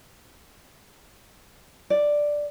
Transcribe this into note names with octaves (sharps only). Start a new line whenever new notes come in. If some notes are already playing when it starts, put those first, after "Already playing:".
D5